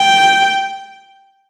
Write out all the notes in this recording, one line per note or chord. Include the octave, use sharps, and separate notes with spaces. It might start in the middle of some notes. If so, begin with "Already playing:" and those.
Already playing: G5